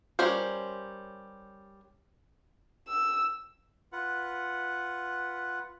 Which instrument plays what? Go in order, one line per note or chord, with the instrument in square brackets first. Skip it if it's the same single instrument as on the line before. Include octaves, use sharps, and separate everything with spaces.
[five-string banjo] G3 C#4 A#4 C5
[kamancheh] E6
[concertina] F4 B4 F#5